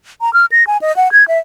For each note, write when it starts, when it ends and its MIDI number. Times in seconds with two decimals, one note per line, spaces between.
0.21 0.33 82
0.33 0.46 89
0.51 0.66 94
0.67 0.77 80
0.81 0.95 75
0.96 1.11 78
1.12 1.27 92
1.28 1.38 76